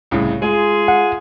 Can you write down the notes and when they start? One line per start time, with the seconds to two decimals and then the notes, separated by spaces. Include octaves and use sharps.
0.11 C2 A2 C#3
0.42 G#3 F4 G#4
0.88 F#5